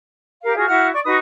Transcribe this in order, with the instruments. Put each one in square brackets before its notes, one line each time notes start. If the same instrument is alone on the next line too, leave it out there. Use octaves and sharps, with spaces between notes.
[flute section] G4 A#4 F5
F4 F#4 G#4
E4 F#4 F#5 F6
D5 C#6
D#4 F#4 B4 D#6